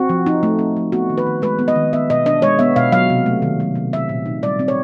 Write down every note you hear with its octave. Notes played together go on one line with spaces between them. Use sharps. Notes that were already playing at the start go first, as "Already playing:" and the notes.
Already playing: C4 F#4
F3
D#4
A3
C4
F3
B3 F#4
D#3
B4
D#3
G#3 B4
B3
D#5
D#3
B3 E5
B2 D#5
D4 D#5
G#3 C#5
B3 E5
B2 F5
F#3 F5
C3
A3
D#3
F#3
C3
C4 E5
A#2
D#4
G3 D5
C4
C#5